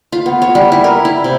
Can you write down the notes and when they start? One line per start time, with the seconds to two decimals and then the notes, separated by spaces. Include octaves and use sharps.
0.12 F4
0.26 B3
0.42 C#5
0.55 G3
0.72 E4
0.84 A#4
1.05 E4
1.24 C3